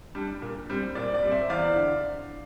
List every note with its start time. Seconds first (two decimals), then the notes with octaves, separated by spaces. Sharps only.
0.15 G3 D4
0.42 A#2
0.69 G3 C4
0.95 A#2 D5
1.14 D5
1.22 G3 C4
1.31 C5 E5
1.49 E2 D5 F5
1.76 D3